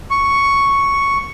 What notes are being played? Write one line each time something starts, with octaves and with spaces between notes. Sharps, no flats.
C#6